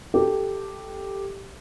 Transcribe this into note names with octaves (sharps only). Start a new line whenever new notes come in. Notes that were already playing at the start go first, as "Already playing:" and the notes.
G4 A4